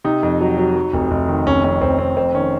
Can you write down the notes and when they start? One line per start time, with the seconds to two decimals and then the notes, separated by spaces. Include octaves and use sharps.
0.04 C3 D#4
0.23 F2
0.41 F#3
0.57 F#3
0.76 F#3
0.93 F1
1.11 F1
1.28 D#3
1.46 F1 C#4
1.64 F2 C#4
1.81 F1 C4
1.99 F1 C4
2.17 F2 C4
2.34 D#3 C#4